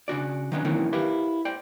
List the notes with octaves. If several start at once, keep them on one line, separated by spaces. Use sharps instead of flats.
C#3 D4 F#4 D5
D#3 F#3 G3 B3 C#4 D4
D#3 E3 F#3 A#3 C4 C#4
E4 G4 A#4 B4 F5
C5 D5 G5